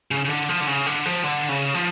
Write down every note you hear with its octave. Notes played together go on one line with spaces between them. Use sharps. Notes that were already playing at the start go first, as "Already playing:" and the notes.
C#3
C#3
D3
F3
D3
C#3
D3
F3
D3
C#3
F3